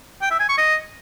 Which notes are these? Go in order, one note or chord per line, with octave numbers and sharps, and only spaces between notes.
G5
E5
G#5
C#6
D#5